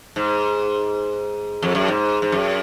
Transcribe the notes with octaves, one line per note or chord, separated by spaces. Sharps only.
G#2
F2
F#2
G#2
G#2
F#2